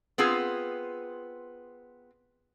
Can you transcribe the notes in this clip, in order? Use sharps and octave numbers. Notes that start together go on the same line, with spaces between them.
B3 C4 F4 G#4